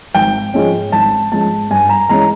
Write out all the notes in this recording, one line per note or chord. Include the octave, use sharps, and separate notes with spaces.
G#1 G5
G#2 F3 G#3 C#4
G#1 A5
G#2 F3 G#3 C#4 A5
G2 G#5
A#5
E3 G#3 C#4 A#5